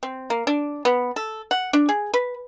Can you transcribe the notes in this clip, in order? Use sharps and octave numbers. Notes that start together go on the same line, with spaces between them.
C4
A#3
D4
B3
A4
F#5
D4
G#4
B4